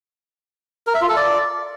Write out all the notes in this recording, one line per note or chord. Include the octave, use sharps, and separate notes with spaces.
A#4
E5
F4
A4
D5